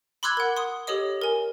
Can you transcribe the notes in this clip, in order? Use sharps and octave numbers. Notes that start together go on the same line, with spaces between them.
B5 C6 D6 E6 F#6 G#6
A#4 F#5
C6 D#6
G4 A4 C#5 D#5 D#6
A#4 G#5